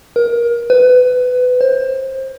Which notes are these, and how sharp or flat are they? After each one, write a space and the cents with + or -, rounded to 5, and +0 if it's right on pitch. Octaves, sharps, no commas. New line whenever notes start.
A#4 +25
B4 +20
C5 +25